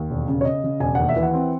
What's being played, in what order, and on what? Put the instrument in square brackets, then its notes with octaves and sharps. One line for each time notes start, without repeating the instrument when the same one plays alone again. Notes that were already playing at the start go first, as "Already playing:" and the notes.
Already playing: [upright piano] D#2
E1
C#3
C#5
C#3 D#5
C#3
E1 G#5
D#2 F#5
E5
E3
F#5
C4